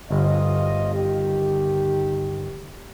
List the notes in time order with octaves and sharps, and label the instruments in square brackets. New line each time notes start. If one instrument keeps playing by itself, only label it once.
[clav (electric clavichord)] G1 [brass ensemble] D2 F4 D#5
[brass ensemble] D#3 G4